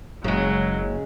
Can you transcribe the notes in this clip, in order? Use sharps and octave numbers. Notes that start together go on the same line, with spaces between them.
F#1 C#3 F#3 G#3